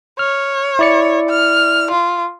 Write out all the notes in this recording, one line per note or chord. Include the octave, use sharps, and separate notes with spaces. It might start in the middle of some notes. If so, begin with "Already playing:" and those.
C#5 F6
E4 D5 C#7
F6
F4